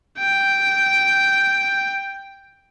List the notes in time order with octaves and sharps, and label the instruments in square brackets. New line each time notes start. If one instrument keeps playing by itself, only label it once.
[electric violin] G5